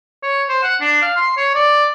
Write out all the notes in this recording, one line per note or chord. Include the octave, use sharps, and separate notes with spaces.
C#5
C5
F#5
D4
F5
C6
C#5
D5